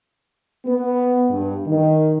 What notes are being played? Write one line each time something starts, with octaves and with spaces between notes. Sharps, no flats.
B3
G2
D#3